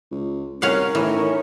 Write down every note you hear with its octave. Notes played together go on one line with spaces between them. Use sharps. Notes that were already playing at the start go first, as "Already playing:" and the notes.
C#2
C2 C#4 A#4 F5 F#5
A2 E3 C#4 D#4 C#5